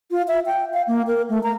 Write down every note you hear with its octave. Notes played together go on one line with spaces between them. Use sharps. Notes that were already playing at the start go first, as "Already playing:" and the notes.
F4
E5
G5
F5
A#3
A#4
A3
A#5